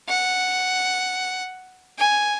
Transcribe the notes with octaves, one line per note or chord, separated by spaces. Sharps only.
F#5
G#5